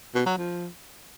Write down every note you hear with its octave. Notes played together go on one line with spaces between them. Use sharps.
B2
F#3
F3